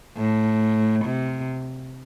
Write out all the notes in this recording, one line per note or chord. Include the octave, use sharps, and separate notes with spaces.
A2
C3